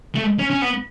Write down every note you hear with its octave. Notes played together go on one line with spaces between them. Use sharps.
A3
C#4
C#4
B3